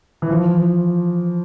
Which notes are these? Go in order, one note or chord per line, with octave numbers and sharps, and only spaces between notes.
E3
F3